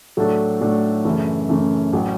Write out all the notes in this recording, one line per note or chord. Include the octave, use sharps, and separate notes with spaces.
A2 F#3 A3 D4 A4
A2 F#3 A3 D4 A4
F#2 C#3 E3 A3
F#2 C#3 E3 A3
A1 F#3